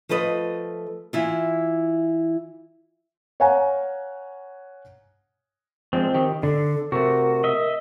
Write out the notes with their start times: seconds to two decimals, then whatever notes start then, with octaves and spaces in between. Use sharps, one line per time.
0.09 F3 A3 A4 B4 D#5
1.13 E3 E4 F4
3.40 C#5 F5 F#5 G#5 A#5
5.93 F3 G#3 C4 D4
6.14 D#3 G4
6.43 D3 D4 A4
6.92 C3 A3 F#4 A#4
7.44 D#5 E5